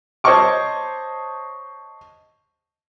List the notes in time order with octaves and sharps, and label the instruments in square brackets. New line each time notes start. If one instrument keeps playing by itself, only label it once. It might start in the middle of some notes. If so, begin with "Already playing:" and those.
[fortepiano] C5 C#5 D#5 A5 C#6 D6